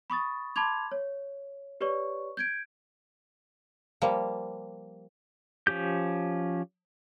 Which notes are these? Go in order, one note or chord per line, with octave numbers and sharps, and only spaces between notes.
B5 C#6 D#6 A6
A5 B5 C6 D6 G#6 F7
C#5
G4 B4 C#5 D5 C#6
G6 G#6 D7
F3 G3 A#3
F3 C#4 G4 G6